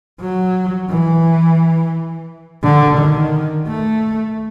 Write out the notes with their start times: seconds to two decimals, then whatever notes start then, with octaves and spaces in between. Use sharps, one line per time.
0.20 F#3
0.89 E3
2.63 D3
2.97 D#3
3.67 A3